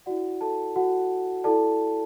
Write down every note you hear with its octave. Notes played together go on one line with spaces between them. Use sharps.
E4 F#4 D5 F#5
A4 A5
F#4 F#5
E4 A4 D5 A5